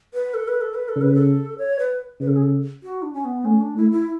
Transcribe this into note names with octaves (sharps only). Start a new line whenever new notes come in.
B4
A4
B4
A4
B4
A4
C#3
B4
A4
C#5
B4
C#3 B4
A4
G#4
A4
F#4
D4
C#4
B3
A3 C#4
D4
A3 E4
E4